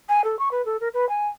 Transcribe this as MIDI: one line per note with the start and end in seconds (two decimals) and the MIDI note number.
0.09 0.24 80
0.24 0.38 69
0.39 0.49 85
0.51 0.64 71
0.65 0.77 69
0.80 0.88 70
0.93 1.08 71
1.09 1.28 80